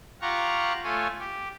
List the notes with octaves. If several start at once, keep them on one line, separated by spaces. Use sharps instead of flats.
F4 G4 F5 F#5 A#5 C#6
A3 F4 C#5 G#5
G4